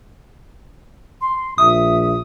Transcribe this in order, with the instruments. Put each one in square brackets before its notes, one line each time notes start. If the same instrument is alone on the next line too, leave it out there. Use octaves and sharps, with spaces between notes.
[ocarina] C6
[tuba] A#1 [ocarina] E5 [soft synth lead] D#6